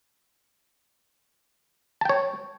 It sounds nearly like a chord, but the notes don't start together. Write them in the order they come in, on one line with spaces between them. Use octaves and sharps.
A5 G5 C#5